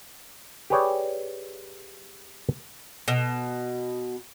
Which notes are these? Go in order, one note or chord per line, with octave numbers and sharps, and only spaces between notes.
G4 G#4 B4 C#5 D5 G5
B2